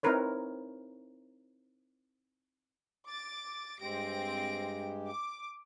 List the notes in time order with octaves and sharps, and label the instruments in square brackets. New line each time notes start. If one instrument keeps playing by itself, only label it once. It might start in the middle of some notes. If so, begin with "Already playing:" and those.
[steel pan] C4 D#4 E4 A#4 B4 C#5
[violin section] D6 A6
[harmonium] G2 G#3 G4 [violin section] C4 A#6 D7
[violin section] D6